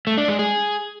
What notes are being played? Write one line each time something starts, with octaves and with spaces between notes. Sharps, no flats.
A3
D4
G#3
G#4